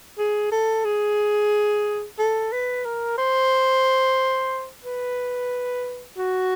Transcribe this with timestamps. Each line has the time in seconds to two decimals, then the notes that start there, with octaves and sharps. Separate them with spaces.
0.18 G#4
0.52 A4
0.85 G#4
2.19 A4
2.52 B4
2.85 A#4
3.18 C5
4.85 B4
6.18 F#4